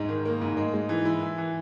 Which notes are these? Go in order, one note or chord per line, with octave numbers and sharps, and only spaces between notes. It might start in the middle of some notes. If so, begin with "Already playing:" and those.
Already playing: G#2 G#3
D#3
A#3
G#2
G#3
G#3
E3
E4
E3
E3